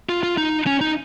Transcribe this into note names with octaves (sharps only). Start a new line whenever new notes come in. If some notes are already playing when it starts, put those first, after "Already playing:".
F4
F4
D#4
C#4
D#4